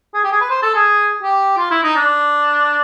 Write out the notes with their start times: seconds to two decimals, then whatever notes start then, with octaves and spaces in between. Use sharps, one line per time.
0.14 G#4
0.23 G4
0.32 G#4
0.41 B4
0.50 C5
0.62 A4
0.74 G#4
1.22 G4
1.57 F4
1.71 E4
1.83 D#4
1.96 D4